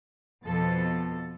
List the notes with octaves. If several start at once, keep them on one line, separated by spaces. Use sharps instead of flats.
F2 B2 F3 A4